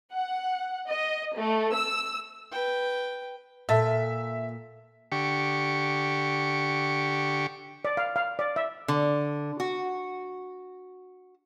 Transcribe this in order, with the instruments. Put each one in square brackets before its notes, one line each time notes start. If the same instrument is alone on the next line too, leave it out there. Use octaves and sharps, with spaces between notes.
[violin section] F#5
D#5
A3
E6
[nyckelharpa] B4 G5
[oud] A#2 [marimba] A4 A5 [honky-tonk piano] E5
[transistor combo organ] D3 G4 C#6
[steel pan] D5
F5
F5
D5
E5
[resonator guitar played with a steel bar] D3
F#4